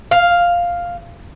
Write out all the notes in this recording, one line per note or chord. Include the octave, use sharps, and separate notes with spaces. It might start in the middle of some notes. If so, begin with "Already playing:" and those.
F5